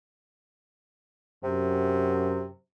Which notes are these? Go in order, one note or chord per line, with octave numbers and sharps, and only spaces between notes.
F#2 C3